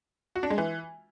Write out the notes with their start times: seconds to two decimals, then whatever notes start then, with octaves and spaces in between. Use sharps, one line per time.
0.36 F#4
0.43 D4
0.50 G#3
0.58 E3